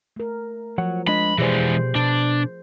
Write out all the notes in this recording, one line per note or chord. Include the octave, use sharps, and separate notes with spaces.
A3 A#4
F3 F#3 C#5 F#5
G#3 D4 D#5 B5
B2 E3 G#3 G4 G#4 C5 D5
B2 D4